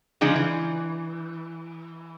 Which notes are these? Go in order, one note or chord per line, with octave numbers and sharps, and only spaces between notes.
C#3 F3 G#3 D4 D#4
E3